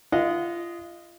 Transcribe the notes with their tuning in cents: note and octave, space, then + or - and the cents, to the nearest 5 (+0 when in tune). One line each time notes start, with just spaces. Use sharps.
F4 -30 D#5 +0 F#5 -20